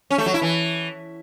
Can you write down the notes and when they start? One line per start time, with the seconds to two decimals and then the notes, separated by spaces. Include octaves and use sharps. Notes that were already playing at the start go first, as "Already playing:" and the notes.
0.10 C#4
0.18 A3
0.26 F#3
0.34 E4
0.42 E3